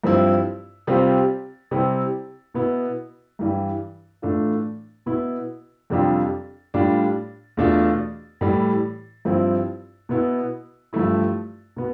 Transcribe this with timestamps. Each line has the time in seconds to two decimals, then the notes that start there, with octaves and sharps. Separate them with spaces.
0.04 G2 F3 C4 E4
0.87 C3 G3 C4 F4
1.71 C3 G3 C4 E4
2.54 B2 B3 E4
3.39 G2 E3 G3
4.22 A2 E3 A3 D4 F4
5.06 B2 B3 E4
5.90 F2 C3 G3 D4 F4
6.74 A2 G3 D4 F4
7.57 E2 B2 A3 D4 F4
8.41 A2 E3 G3
9.25 G2 F3 C4 E4
10.09 B2 B3 E4
10.93 G2 F3 A3 E4
11.76 B2 B3